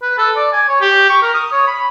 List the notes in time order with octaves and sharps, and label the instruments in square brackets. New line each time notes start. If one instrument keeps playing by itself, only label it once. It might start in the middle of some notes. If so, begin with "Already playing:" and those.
[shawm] B4
A4
D5
G#5
C#5
G4
C#6
A#4
D#6
C#5
B5